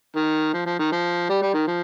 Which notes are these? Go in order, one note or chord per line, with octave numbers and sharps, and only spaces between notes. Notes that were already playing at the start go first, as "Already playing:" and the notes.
D#3
F3
F3
D#3
F3
G3
G3
D#3
F3